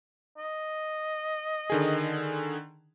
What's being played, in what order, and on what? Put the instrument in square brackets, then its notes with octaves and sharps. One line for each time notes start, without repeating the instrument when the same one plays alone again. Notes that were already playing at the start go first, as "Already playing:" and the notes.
[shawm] D#5
[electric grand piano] D3 D#3 G#4